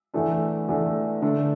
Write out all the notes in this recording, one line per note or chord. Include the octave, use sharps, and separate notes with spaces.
E2 E3 A3 D4
E2 E3 A3 D4
D3 A3 D4